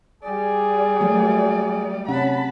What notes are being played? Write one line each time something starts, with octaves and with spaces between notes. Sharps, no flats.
G3 G#4 D5
F#3 A3 A#3
C3 C#4 F#5 A5 B5